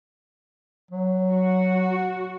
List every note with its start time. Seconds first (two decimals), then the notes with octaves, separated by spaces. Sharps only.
0.91 F#3
1.30 F#4